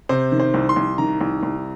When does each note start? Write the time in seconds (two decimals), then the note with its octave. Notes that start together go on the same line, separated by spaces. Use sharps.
0.09 C3 C5
0.32 D#3
0.40 C5
0.54 C2
0.69 C6
0.76 C2
0.98 D#3 A#5
1.21 C2
1.43 C2